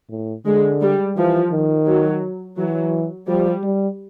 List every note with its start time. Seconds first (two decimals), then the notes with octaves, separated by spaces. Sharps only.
0.10 A2
0.46 D3 G#3
0.81 G3
1.16 E3 F3
1.51 D#3
1.87 F#3
2.57 E3 F#3
3.28 F3 G3
3.63 G3